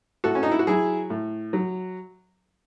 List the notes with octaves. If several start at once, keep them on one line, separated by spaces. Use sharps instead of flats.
A2 F#4 A4
C#4
D#4
E4
F#4
F#3 E4 G#4
A2
F#3